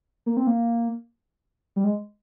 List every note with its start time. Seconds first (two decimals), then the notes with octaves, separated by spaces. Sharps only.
0.26 A#3
0.37 C4
0.47 A#3
1.76 G3
1.84 G#3